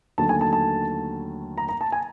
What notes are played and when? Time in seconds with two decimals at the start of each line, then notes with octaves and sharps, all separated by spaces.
0.18 D#2 D3 F#3 A3 A5
0.29 G#5
0.41 A5
0.53 A5
1.58 A#5
1.69 A#5
1.81 A5
1.92 G#5